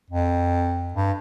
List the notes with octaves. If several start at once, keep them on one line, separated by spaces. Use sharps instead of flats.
F2
G2